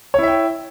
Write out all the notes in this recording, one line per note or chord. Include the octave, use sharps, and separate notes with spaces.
E4 C#5 E5 G5